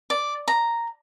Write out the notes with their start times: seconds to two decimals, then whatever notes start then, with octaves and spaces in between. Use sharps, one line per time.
0.10 D5
0.48 A#5